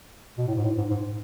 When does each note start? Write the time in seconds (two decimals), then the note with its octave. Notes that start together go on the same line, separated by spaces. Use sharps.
0.38 B2
0.47 A2
0.55 G#2
0.64 A2
0.77 G#2
0.90 G#2